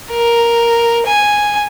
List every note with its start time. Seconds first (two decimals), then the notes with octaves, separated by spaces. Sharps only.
0.10 A#4
1.06 G#5